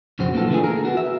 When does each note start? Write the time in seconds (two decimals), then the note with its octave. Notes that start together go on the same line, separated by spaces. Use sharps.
0.19 B1 F2 C#3 F#4 C5
0.34 A#3 B3 D#4 F4 A4
0.50 D3 E3 A3 C#4 D4 G#4
0.64 G#4 A#4
0.85 B3 F#4
0.97 E5